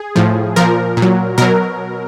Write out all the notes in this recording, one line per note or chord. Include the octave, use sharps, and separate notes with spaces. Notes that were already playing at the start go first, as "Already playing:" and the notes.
Already playing: G#4
A2 F3
A#2 F3 A#4
A#2
F#3
B2 F#3 A#4